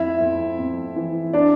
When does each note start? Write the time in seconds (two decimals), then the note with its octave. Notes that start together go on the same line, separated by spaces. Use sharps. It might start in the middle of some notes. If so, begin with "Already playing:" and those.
Already playing: F2 E4 E5
0.20 F2
0.59 F2
0.96 E3
1.33 D4 D5